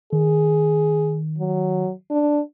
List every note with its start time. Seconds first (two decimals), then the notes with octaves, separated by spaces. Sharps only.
0.13 D#3 G#4
1.38 F#3
2.11 D4